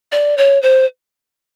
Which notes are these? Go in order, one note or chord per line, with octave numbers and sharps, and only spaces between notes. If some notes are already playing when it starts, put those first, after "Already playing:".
D5
C#5
C5